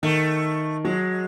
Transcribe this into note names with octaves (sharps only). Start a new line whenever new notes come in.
D#3 A3
F#3 G#3